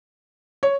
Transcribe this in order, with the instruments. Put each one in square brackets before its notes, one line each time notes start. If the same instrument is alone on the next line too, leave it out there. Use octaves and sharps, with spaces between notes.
[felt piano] C#5